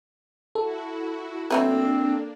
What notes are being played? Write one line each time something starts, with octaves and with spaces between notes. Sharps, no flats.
E4 F#4 A4
F#3 A3 A#3 C4 D4 B4